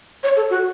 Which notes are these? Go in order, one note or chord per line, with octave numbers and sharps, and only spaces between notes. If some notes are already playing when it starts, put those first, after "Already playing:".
C#5
A4
F#4